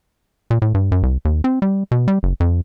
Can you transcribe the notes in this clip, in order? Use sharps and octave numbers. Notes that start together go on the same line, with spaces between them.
A#2
A2
G2
F#2
C2
D#2
C4
G3
B2
G3
F#1
F2